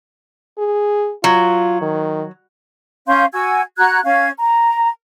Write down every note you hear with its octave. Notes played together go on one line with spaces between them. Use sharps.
G#4
F#3 F4
D#3
C#4 F5 C6 G6
F#4 G#5 E6 G#6
F#4 A#5 F#6 G#6
C#4 F5 G#6
A#5